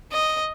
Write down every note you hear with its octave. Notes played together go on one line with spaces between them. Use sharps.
D#5